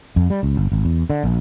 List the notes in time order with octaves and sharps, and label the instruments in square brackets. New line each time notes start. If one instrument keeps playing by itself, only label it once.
[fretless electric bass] F2
G3
C#2
G1
G#1
E2
D3
A#1